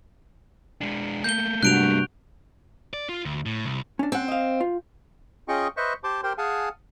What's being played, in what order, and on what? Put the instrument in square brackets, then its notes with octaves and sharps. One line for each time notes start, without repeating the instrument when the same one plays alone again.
[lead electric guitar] G#3 D4
[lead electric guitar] A3 A#3 [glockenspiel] G6 G7
[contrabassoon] G2 [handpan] C3 G#3 F#4 [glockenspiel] F#6 D7 F7
[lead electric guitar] D5
F4
D2
A2
C2
[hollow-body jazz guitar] C#4 D4
[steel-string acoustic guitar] C4 [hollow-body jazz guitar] C#4 F#5
[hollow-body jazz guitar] D#5 F5
F4
[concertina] C#4 F4 G#4 D#5 G5 C#6
B4 C5 D#5 E5 C#6
G4 C5 A5 C6 D6
G4 A#4 C5 G5 C6
G#4 F5 F#5 G#5 A5